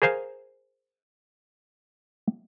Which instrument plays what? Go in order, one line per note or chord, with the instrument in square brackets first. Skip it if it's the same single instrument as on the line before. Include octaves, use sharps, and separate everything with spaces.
[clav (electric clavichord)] G#4 A#4 C5 F5 G#5